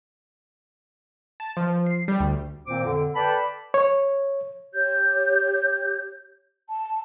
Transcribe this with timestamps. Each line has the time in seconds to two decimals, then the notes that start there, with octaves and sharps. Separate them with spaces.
1.40 A5
1.57 F3
1.86 C7
2.08 G3
2.20 D2
2.66 A#2 D#3 A#3 C4 C5 D6
2.84 F2 D3
3.14 A4 B4 D5 G5 A5 B5
3.74 C#5
4.73 G4 C#5 G6
6.68 A5